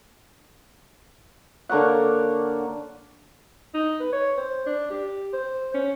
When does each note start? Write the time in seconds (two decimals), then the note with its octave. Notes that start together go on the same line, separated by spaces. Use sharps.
1.69 D3 A#3 C#5 F#5
3.74 D#4
4.00 B4
4.13 C#5
4.38 C5
4.66 D4
4.90 G4
5.33 C5
5.74 C#4